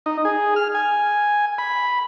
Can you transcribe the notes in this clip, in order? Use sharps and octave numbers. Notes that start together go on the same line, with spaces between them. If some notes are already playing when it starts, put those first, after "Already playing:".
D#4
G#4
F6
G#5
B5